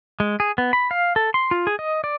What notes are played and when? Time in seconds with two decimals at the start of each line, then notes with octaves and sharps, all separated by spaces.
0.20 G#3
0.40 G#4
0.58 B3
0.73 B5
0.91 F5
1.16 A4
1.34 C6
1.51 F4
1.67 G#4
1.79 D#5
2.04 D5